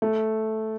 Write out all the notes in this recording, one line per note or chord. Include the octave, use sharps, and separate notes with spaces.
A3